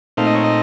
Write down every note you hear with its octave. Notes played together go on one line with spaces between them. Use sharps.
A#2 A3 C4 D#4 F5
D#5
C#5
D#5